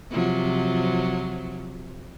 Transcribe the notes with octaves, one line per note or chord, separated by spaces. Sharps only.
C3 F3 F#3